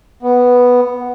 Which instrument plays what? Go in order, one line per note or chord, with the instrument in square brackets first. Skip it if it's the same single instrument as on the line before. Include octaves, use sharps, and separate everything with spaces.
[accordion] B3